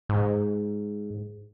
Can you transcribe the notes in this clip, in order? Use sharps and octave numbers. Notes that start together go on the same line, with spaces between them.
G#2